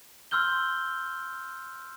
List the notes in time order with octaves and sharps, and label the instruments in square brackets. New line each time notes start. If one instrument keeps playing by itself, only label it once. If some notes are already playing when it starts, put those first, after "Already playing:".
[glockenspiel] C6 E6 F6 G6 G7